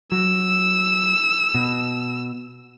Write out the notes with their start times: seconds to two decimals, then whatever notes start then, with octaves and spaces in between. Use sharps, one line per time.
0.12 F#3 E6
1.54 B2